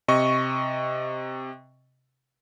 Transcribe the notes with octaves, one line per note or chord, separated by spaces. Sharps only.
C3 D#5 C#6